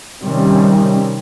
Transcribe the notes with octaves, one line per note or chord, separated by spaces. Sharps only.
C3 D#3 G3 C4 C#4